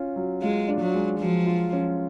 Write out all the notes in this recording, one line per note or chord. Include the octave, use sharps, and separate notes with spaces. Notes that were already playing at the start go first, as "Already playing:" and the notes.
Already playing: C#4 F4
F#3
G#3 F4
D4
F#3
G#3
F3 F#3
F4
C#4